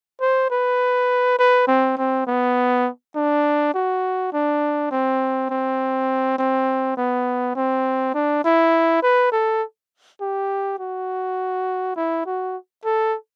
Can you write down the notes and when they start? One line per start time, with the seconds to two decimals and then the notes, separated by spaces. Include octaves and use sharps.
0.21 C5
0.51 B4
1.39 B4
1.68 C4
1.98 C4
2.27 B3
3.15 D4
3.74 F#4
4.33 D4
4.91 C4
5.50 C4
6.38 C4
6.97 B3
7.56 C4
8.15 D4
8.44 E4
9.03 B4
9.32 A4
10.21 G4
10.79 F#4
11.96 E4
12.26 F#4
12.85 A4